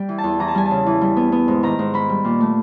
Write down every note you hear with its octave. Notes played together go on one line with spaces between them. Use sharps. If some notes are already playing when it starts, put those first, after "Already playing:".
Already playing: G3 G5
E3
A5
E2
E3 A#5
A5
G3 G#5
A5
C#3
E3
G3
B3
B3
G#2
D#3 A#5
G#2
D#3 B5
G3
A#2
A3